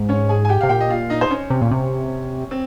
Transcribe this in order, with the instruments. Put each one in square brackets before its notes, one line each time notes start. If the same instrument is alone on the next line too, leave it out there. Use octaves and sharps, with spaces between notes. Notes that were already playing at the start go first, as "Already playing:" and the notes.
Already playing: [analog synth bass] G#2
[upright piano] C#4 C#5
G#4 G#5
G#5
G4 G5
[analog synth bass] C3 [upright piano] F5
[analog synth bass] A#2 [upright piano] G4 G5
[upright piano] D#5
F4 F5
D#4 D#5
C5
C#4 C#5
[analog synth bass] C3
A#2
C3
[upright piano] C4